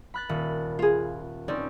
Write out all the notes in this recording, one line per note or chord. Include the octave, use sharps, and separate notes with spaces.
B5 F#6 A6
D#1
F4 G#4
C4 C#4 D#4 D5